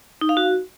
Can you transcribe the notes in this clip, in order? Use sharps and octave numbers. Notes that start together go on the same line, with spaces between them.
D#4
F5
F#4